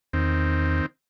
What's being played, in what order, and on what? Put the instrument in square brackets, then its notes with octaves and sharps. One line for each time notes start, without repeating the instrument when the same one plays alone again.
[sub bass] E2 [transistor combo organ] D#3 C4